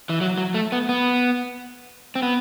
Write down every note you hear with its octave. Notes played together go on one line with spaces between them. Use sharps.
E3
F#3
F#3
A3
B3
B3
C4
B3